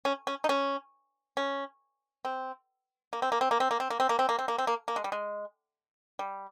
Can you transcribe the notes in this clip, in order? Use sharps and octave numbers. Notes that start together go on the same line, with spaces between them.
C#4
C#4
D#4
C#4
C#4
C4
A#3
C4
A#3
C4
A#3
C4
A#3
C4
A#3
C4
A#3
C4
A#3
C4
A#3
C4
A#3
A#3
G#3
G3
G#3
G3